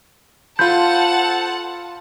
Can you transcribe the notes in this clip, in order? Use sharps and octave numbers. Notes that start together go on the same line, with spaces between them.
F4 A4 C5 F#5 A5 B5 G6